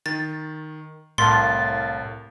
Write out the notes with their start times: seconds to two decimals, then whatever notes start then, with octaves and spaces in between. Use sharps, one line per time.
0.06 D#3 A6
1.18 C2 A2 A#4 F5 A5 C6 A6